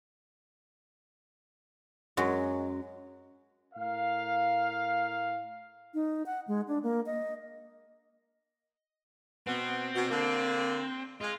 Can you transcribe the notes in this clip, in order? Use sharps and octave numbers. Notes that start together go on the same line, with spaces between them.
F#2 F#3 G#3
A2 A#4 F5
D#4
F#5
G#3
D4
A#3
D#5
B2 B3 C4
B2
D3 A#3
G#3 F4